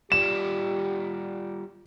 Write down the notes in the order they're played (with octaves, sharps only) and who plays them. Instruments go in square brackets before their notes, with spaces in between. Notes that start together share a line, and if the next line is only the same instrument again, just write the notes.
[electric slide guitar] G3 F4 D5 [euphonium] G4 [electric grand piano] E7